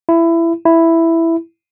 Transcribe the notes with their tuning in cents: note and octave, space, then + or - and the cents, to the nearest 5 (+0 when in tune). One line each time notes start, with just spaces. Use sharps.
E4 +20
E4 +5